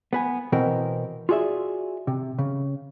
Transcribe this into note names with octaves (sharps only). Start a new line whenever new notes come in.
B3 B4 G#5
B2 E3 B3 C4 A#4
F4 F#4 G#4 D5 E5
C3
C#3